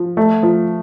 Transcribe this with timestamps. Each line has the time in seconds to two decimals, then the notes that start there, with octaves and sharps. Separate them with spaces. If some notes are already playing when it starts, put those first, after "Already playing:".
Already playing: F3
0.17 A3
0.43 F3